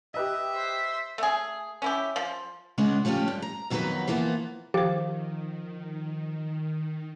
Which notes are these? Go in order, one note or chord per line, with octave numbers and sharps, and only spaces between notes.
G4 B4 D#5 E5
C5 B6
A3 G#4
C#4 E4 G4
F3
C#3 G#3 B3 C#4 D4
F3 A3 C#4 F4 G4
G2
A#5
F2 D#3 F#3 B3 F#4 B4
E3 F3 A#3 B3
D#3 F3 G4 C5 F5